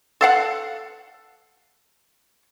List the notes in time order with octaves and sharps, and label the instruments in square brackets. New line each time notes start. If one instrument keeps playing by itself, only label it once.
[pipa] A4 F5 F#5